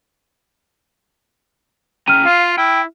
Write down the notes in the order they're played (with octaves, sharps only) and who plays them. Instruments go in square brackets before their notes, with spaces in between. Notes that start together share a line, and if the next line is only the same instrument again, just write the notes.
[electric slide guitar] C#4 G5 A#5 [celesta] F6 D#7
[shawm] F4 [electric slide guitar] F5
[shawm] E4 [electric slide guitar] G5